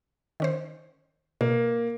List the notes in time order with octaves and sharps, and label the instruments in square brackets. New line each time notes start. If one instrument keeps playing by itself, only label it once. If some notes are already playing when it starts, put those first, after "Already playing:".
[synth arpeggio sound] D#3 C#4 C5
[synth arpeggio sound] B2 [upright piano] A#3